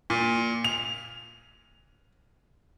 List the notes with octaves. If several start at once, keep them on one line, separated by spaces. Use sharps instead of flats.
A#2
F7